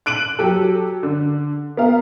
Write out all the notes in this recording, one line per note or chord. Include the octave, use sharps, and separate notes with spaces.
F#6 D7 D#7 F#7
F#3 G4 A4
D3
B3 A#4 F5